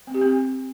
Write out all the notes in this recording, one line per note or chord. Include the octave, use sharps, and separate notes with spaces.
C4
G4
C4